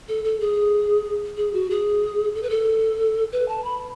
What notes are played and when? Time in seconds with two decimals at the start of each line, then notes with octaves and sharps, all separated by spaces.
0.08 A4
0.24 A4
0.40 G#4
1.37 G#4
1.53 F#4
1.70 G#4
2.35 A4
2.42 B4
2.50 A4
3.32 B4
3.49 A5
3.64 B5